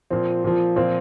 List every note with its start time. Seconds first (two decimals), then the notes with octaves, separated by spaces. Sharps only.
0.10 A#2 F3 C4
0.44 A#2 F3
0.76 A#2 F3 C4